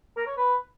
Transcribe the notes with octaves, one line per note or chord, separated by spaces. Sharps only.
A#4
C#5
B4